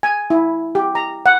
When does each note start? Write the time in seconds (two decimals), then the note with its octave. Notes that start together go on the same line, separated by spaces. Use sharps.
0.03 G#5
0.30 E4
0.75 G4
0.95 A#5
1.26 F#5